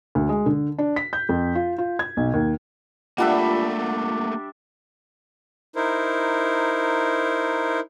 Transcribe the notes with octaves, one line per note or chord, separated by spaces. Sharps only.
D2
G#3
D3
D4
B6
G6
F2
F4
F4
G#6
B1
D#2
G3 A3 A#3 D4 F4 E5 F#5
D#4 E4 A#4 C5